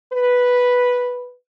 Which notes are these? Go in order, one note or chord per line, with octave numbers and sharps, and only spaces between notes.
B4